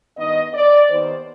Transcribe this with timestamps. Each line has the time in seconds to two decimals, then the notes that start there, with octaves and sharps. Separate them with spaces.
0.17 G2 D#3 B3 D#5
0.54 D5
0.89 D#2 D#3 B3 C5